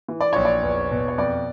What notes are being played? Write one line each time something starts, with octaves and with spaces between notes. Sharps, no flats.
E3
D5
A#1 C#5
D5
E2
B2
C#5
F2 D5